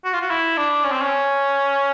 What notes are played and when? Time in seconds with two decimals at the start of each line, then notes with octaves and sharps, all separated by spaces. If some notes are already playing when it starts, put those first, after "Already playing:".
0.04 F#4
0.13 F4
0.21 F#4
0.30 E4
0.57 D4
0.84 C#4
0.92 C4
1.02 C#4